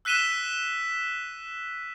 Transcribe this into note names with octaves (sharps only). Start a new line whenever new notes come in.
E6 F#6 B6 D#7 E7 G7